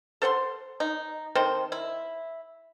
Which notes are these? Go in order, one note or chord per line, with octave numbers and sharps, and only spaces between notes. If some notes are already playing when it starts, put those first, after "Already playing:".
A4 C5 F#5 C6
D#4
D#3 C4 A4 C5
E4